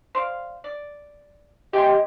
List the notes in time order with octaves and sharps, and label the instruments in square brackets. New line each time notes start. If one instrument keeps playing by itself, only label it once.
[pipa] C5 D5 F5
D5
[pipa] C3 G#5 C6 [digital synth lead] G4 [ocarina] D#5